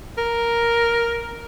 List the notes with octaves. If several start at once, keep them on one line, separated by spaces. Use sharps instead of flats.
A#4